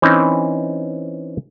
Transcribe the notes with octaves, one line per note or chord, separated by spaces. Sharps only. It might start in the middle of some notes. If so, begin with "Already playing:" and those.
E3 C4 C#4 D#4